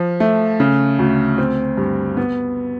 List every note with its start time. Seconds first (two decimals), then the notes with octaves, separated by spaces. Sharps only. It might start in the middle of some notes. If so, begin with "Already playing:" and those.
Already playing: F3
0.20 A3
0.60 C#3
0.99 D2
1.38 C4
1.77 G2
2.17 B3